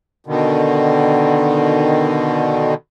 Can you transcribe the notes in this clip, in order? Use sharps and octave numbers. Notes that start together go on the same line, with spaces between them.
B2 D3 D#3